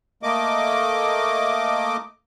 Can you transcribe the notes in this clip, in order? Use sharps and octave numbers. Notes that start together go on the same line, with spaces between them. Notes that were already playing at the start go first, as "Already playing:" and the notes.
A3 A#3 D#5 D6